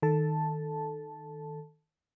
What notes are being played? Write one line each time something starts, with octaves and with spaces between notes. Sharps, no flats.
D#3 A4 A5